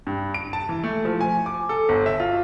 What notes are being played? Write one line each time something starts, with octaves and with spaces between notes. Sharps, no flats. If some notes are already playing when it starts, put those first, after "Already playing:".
G2
D7
A5
E3
A3
F3
G#5
D6
A4
G1
E5
F4